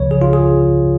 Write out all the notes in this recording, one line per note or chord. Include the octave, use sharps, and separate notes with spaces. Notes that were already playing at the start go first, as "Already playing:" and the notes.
Already playing: C#2 C#3 F3 C#5
G#4
F4
G#4